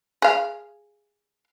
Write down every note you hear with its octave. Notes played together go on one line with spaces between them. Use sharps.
G#4 F5